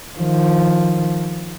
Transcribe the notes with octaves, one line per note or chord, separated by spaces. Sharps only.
D#3 F3